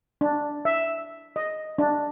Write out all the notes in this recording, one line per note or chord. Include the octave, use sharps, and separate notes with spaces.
D4
E5
D#5
D4